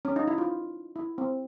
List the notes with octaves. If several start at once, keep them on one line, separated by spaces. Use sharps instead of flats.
C#4
D#4
E4
F4
E4
C4